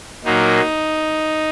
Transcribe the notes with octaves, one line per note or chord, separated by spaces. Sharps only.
A#2 F#3 A#3 D#4